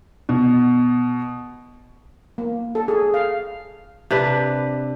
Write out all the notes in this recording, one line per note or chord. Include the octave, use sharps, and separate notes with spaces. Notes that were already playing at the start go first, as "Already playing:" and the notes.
B2
A#3
A4
G#4
F5
C3 D4 B4